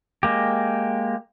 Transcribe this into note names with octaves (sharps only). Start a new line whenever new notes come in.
G#3 A#3 G4